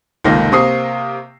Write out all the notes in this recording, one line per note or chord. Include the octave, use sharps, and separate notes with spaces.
F1 C#2 D#3 A#3 F4 A#6
C3 A#3 C4 C#6 D#6 C7